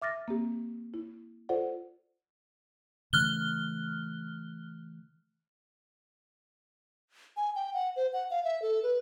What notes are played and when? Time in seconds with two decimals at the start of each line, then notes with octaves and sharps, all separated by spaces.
0.02 E5 D6 F6 A6 A#6
0.28 A#3 C4 G4
0.94 E4
1.49 F4 A4 C5 D5 F#5
3.13 C#3 E3 A3 F6 F#6 G7
7.37 G#5
7.56 G5
7.74 F#5
7.96 C5
8.13 F#5
8.31 F5
8.44 E5
8.62 A4
8.83 B4